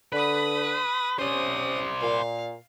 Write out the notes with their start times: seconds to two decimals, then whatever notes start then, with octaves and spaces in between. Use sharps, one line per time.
0.12 D3 B4 B5 D#6
1.19 C3 C#4 C5 D5 D#6
2.01 A#2 F5